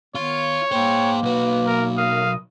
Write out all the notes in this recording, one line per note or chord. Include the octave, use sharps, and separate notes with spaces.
D#3 B3 F4 C#5
A#3 G#4 C5 G5
B1 F#4 B4
A#4
A#4 F5 D#6